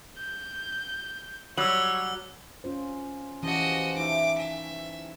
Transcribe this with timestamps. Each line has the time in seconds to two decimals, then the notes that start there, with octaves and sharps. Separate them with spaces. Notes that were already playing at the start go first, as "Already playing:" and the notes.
0.18 G6
1.57 F#3 G3 C#5 E6 F#7
2.64 C#4 F4 C5
3.43 E3 F3 C#4 F#4 G4 D#5
3.97 E3 A3 D#4 E4 D6
4.38 E5